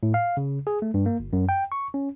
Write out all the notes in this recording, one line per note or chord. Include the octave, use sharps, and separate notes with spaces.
A2
F5
C#3
G#4
A3
G2
A#3
G1
F#2
G5
C#6
C#4